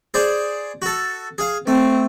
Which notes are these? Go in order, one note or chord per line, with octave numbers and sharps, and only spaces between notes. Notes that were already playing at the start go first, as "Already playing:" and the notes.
G#4 C5 D5
F#4 A4
G#4 F5
A3 C4